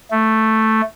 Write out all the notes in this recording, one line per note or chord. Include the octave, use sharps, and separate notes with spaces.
A3